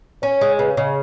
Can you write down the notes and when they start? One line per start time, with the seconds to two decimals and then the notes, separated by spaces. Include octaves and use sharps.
0.22 C#4 C#5
0.32 C#5
0.41 G#3 D#5
0.50 C#5
0.59 C#3 B4
0.69 C#5
0.77 C#3 D#5
0.87 C#5